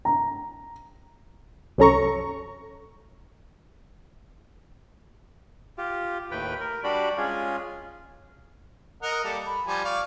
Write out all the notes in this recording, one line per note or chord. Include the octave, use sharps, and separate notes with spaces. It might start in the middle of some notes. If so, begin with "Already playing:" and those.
A#5
C2 F#2 C#4 A4 A#5 C#6
F4 G4
D#2 A2 B4 G5
A#4
G3 D4 F#4 G4 D5 B5
G#3 C#4 F4 G#4
A#4 D#5 F#5
G3 A#3 A4
B5
F3 G3 G#5
D5 F5 C#6